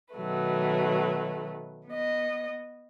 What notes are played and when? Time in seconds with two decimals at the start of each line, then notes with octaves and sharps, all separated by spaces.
0.14 B2 D#3 F#3 A3 B4
1.86 B3 D#5